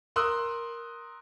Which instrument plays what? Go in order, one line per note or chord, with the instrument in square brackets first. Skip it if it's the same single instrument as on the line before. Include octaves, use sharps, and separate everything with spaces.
[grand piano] A#4 C6 D#6 E6 F#6